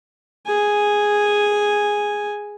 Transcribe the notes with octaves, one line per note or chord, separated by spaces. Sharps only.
G#4 G#5